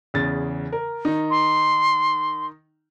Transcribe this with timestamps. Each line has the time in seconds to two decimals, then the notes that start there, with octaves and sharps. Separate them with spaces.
0.14 E2 C#3 A6
0.72 A#4
1.05 D#3 D#4
1.30 C6